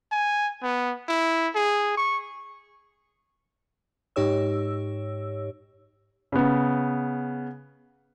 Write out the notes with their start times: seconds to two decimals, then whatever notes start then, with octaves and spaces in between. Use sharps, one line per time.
0.12 G#5
0.63 B3
1.08 E4
1.55 G#4
1.97 C#6
4.16 G#2 D#4 G4 C#5 E6
6.32 C#3 B3